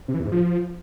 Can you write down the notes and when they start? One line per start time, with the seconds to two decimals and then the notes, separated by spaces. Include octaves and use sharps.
0.08 C3
0.14 E3
0.20 E2
0.26 G#2
0.32 F3